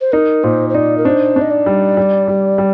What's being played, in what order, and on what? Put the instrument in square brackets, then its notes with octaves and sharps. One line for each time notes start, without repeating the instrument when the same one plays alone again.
[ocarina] C5
[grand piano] D#4 [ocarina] A#4
[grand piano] A#2 [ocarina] C5
[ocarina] C5
[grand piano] D#4 [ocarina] D5
[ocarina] A#4
[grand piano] D4 [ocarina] C5
[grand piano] D4
[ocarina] D#5
D5
[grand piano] G3
G3
G3
G3